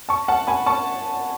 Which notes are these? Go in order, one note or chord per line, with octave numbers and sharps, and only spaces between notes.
A5 C#6
F#5 A5
G#5 B5
A5 C#6